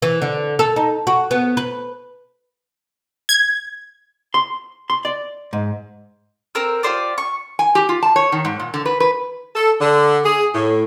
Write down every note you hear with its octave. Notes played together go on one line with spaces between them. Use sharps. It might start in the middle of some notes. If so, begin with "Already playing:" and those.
E3
D3
A4
D#4
F#4
B3
B4
G#6
C6
C6
D5
G#2
C4 A#4 E6
F4 G4 C5 D5
C#6
G#5
G4
F4
A5
C#5
D#3
G#2
A#2
D3
B4
B4
A4
D3
G#4
A2